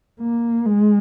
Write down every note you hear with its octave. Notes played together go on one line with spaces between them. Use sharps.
A#3
G#3